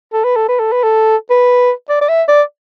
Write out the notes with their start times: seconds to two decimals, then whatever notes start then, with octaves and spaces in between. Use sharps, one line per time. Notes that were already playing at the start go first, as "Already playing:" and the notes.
0.13 A4
0.24 B4
0.36 A4
0.48 B4
0.59 A4
0.72 B4
0.83 A4
1.30 B4
1.89 D5
2.01 D5
2.09 E5
2.28 D5